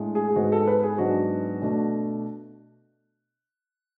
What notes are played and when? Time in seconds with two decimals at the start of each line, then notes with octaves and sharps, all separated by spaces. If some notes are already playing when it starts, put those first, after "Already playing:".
Already playing: A2 G#3 D4
0.15 G#4
0.28 G#4
0.36 G#2 G#3 B3 F#4
0.52 A4
0.68 B4
0.83 G#4
0.98 G#2 F#3 B3 D4 F#4
1.62 B2 A3 D4